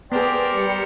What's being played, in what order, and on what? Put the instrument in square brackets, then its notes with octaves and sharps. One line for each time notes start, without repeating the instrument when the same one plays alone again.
[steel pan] B3 G#4 [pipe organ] G4 A#4 C5 [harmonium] D5 G5
[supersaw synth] G3 C#7